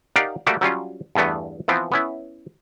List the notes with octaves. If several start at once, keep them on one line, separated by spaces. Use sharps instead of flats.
D#4 G4 A#4 D5 F5 F#5
G3 A3 A#3 F#4 G4
F#3 G3 C#4 F4
E2 G2 E3 A3 B3
E3 F3 B3 C4
B3 C#4 E4